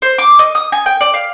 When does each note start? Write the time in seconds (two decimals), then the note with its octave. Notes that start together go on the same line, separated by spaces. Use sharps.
0.02 C5
0.18 D6
0.39 D#5
0.55 D#6
0.72 G#5
0.86 G5
1.01 D5
1.14 F5